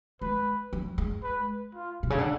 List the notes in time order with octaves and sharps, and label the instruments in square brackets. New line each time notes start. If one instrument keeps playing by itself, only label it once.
[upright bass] G#3 [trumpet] B4
[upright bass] F3
G#3
[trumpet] B4
F4
[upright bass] B2
C#3
D3